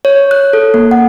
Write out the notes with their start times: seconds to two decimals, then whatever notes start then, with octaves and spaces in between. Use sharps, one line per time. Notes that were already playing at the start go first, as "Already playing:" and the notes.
0.05 C#5
0.31 F#6
0.53 A4
0.74 A#3
0.91 F#5